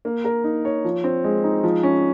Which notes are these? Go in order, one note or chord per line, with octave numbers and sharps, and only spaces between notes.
A#3
A#4
D#4
C#5
F3
C4
G#3
D#4
F3
C#4